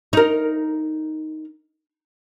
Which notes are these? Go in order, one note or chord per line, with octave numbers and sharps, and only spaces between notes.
D#4 A#4